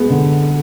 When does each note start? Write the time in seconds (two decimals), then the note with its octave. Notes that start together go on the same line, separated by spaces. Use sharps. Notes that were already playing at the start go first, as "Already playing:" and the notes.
Already playing: G#3 B3
0.10 D3